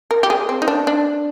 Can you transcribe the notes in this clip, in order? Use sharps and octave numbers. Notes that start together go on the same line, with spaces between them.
A#4
G4
G#4
C4
D#4
D4
D4